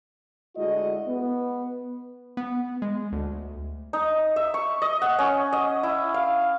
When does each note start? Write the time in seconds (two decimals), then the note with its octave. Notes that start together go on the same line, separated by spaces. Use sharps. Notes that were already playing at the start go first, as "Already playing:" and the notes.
0.56 D2 G#3 E4 F#4 D#5
1.07 B3
2.37 B3
2.82 G#3
3.12 D2
3.93 D#4
4.36 E5
4.54 C#6
4.82 D#5
5.02 F#5
5.19 C#4
5.53 D#5
5.83 E4
6.14 F5